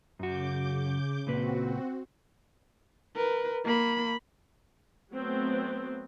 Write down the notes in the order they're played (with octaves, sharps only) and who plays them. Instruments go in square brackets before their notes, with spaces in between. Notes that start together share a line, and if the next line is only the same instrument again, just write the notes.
[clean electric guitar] F#2 F#4 [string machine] C#3 D6 G6
[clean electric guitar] C#2 A#2 B4 [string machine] C4 F#4
[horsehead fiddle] A#4 B4
A#3 B5
[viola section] F#3 A3 B3 C4